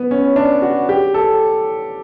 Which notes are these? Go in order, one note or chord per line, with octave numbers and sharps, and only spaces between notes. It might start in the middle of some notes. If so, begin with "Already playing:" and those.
Already playing: B3
C#4
D4
F#4
G4
A4